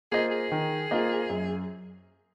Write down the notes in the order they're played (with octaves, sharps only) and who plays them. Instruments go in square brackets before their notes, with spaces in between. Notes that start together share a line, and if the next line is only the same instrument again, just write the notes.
[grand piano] A#3 F4 C5 D#5 [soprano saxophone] G#4
[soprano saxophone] G#4
[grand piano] D#3
A#3 F4 C5 D#5
F#2